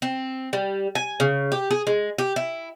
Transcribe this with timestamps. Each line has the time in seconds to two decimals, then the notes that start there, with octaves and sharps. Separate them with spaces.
0.02 C4
0.53 G3
0.95 G#5
1.20 C#3
1.52 G4
1.71 G#4
1.87 G#3
2.18 G4
2.36 E4